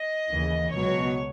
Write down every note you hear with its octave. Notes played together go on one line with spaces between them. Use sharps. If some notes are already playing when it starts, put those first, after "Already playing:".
Already playing: D#5
D#2 C#3 E3
C#2 B2 F#3 C#5